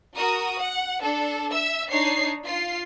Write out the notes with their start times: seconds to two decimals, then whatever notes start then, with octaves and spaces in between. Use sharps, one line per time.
0.16 F#4 A#4 D#6
0.61 F#5
1.03 D4 A4
1.51 E5 E6
1.90 D4 D#4 C#5 C7
2.45 F4 C7